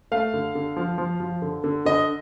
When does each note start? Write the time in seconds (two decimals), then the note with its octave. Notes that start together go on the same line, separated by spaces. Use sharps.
0.12 A3 F5
0.34 D3
0.55 D3
0.76 F3
0.98 F3
1.20 F3
1.42 D3
1.64 D3
1.85 D3 D#5